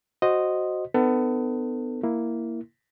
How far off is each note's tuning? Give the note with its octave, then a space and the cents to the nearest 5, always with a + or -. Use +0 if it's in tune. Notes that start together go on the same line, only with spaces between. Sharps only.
F#4 +0 C5 +0 D#5 -5
B3 +30 D#4 -45 A4 +30
A#3 +0 E4 +0